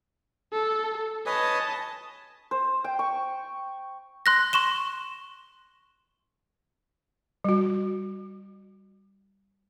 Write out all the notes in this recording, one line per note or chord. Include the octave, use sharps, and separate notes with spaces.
A4
B4 C#5 D#5 G#5 A5
C5
G5
C#6
C6 F#6 A#6
C6 C#6 E7 G7
G3 F#4